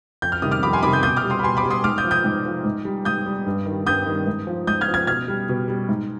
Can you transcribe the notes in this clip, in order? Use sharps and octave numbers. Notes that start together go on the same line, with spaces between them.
F2 G6
F6
C3 D#3 G3 D#6
D6 F6
F2 B5 D6
G#5 C6
C3 D#3 G3 B5 D6
D#6 G6
B2 D#6 G6
D6 F6
G3
C6 D#6
B5
B2 G#5 C6
B5 D6
G3
C6 D#6
G#2 D6 F6
D#6 G6
F3
D#6 G6
G#2
F3
G#2
G3
G#2 D#6 G6
G3
G2
D#3
G3
G2 D#6 G6
D#3 G3
G#2
F3
G#2 D#6 G6
F6 G#6
F3
F6 G#6
B2 F6 G#6
G3
B2
G3
G#2